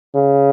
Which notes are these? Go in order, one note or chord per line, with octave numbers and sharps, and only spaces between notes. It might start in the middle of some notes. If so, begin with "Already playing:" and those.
C#3